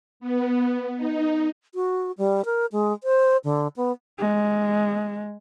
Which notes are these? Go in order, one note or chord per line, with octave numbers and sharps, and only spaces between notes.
B3
D#4
F#4
G3
A#4
G#3
C5
D3
B3
G#3